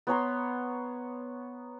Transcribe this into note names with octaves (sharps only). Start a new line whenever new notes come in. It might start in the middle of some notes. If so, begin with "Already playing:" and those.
B3 C#5 A#5 C6